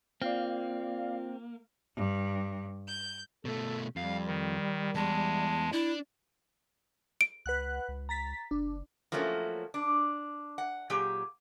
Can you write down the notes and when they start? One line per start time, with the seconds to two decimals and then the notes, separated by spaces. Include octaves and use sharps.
0.22 A#3 C4 F4 D5 F5
1.96 G2
2.87 G6
3.45 B2 A3 A4
3.96 F2 G3 F5
4.27 D#3
4.95 E2 G#3 A5
5.73 D4 E4
7.21 D7
7.46 C#2 B4 F#5 F#6
7.88 C#2
8.09 A#5 A6 B6
8.51 F#1 D4
9.12 F3 F#3 A3 A#3 C#4
9.74 D4
10.58 F#5
10.90 A#2 F#3 G4 G#4